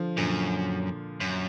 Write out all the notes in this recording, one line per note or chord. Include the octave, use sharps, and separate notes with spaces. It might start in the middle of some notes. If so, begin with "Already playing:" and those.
Already playing: D3 F3
F#2 A#2 D3
F#2